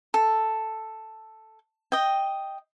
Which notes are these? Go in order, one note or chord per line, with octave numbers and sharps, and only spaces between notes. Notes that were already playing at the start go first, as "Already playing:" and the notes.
A4
D#5 G5